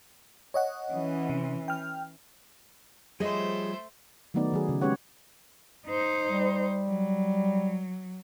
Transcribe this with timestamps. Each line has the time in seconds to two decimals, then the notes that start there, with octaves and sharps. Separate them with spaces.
0.54 C#5 D#5 F#5
0.92 E3 C#4
1.29 C3
1.68 G5 F6
3.20 F3 G3 A3 G#4 C5 C#5 D#5 G#5
4.34 D#3 F#3 A3 B3 D#4 D5
4.52 D#3 F#3 G#4
4.69 C#3
4.82 G#3 C#4 G4 B4 C#5 F#5
5.87 D#4 C5
6.29 G3
6.86 F#3